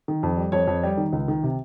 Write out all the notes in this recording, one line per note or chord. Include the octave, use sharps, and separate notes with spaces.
D#3
F2
G3
F2 C#5
F2
G3
D#3
C#2
D#3
C3